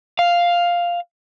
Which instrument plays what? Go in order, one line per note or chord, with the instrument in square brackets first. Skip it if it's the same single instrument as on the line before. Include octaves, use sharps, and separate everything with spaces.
[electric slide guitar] F5